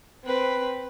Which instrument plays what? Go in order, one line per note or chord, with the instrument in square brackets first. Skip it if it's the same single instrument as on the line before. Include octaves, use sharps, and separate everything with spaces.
[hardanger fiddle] C4 B4